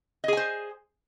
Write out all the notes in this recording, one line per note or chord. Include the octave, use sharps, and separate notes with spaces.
G#4 C5 D#5 G#5